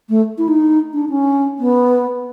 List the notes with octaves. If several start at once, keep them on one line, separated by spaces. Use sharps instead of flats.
A3
E4
D#4
D4
C#4
B3